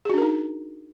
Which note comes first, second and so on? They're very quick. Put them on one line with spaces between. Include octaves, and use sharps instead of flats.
G#4 F#4 D4 A#4 D#4